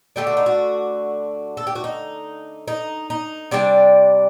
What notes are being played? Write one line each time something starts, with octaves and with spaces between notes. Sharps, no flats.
D3 A3 D4 G4
F#4
D#4
F#4
A4
G4
F#4
D#4
D#4
D#4
C3 G3 D4 D5